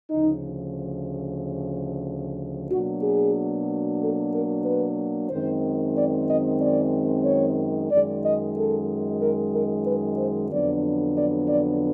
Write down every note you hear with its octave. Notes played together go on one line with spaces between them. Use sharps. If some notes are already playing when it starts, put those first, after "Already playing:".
D2 C#3 F3 D#4
B2 F#3 A#3 D4 F#4
G#4
A4
A#4
B4
F#2 D#3 G#3 C4 C5
D5
D#5
D5
C#5
F#2 D#3 G#3 D5
D#5
A4
A#4
A#4
B4
C5
F2 D3 F#3 B3 D4 D5
D5
D5